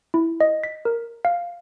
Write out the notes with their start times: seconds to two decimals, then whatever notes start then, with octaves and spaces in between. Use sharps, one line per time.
0.14 E4
0.40 D#5
0.64 B6
0.85 A#4
1.25 F5